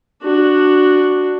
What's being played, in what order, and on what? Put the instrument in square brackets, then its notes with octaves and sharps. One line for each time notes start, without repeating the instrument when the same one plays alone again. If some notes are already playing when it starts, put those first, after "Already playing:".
[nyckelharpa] D4 F#4